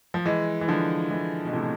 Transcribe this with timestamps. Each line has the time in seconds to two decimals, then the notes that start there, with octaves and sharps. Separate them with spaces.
0.14 F3
0.25 E3 G#3
0.61 E3
0.68 D3 F3
1.11 E3 G#3
1.45 B2
1.53 A2 C3